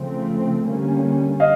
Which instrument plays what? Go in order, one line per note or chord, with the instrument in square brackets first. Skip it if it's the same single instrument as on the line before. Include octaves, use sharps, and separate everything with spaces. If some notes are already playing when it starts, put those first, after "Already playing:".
Already playing: [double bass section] C#3 F3 A3 C4
D3 G3 A#3 C#4
[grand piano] D#5 F5